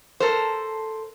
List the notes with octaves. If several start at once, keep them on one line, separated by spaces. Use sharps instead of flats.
A4 A#4 C5